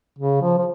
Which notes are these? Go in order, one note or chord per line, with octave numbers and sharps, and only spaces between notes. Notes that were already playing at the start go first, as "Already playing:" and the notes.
C#3
F3
F3